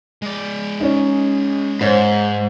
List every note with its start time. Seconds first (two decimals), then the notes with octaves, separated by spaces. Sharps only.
0.22 G#3 D5
0.80 C#4 D#4
1.81 G#2 C5 C#5